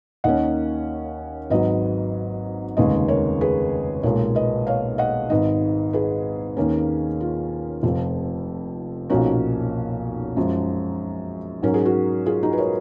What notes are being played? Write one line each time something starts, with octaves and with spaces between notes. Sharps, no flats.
D#2 D#3 A#3 C#4 D#5 F#5
G#1 G#2 F#3 B4 D#5
F1 D#2 C#3 G#3 B4 D#5
A#4 C#5
G#4 B4
B1 A#2 G#3 A#4 C#5
B4 D#5
C#5 F5
D#5 F#5
G#1 G#2 D#3 B4 D#5
G#4 B4
D#2 D#3 A#3 C#4
F4
F1 F2 F3
B1 A#2 F3 A#3 C#4 D#4 F#4
F#2 F3 G#3
G#2 F#3 C#4 A#4
G#4
F#4 A#4
F4 G#4
D#4 F#4
B4
A#4 C#5